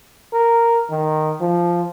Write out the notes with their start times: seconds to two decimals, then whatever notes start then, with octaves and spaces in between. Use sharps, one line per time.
0.33 A#4
0.90 D#3
1.41 F3